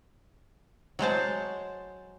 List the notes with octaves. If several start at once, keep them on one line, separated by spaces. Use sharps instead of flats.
F#3 G#3 C5 A5